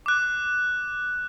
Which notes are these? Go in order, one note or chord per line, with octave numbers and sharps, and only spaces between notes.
D6 F#6